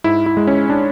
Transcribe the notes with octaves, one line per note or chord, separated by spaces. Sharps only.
G#2 E4
E4
G#3
C#4
D4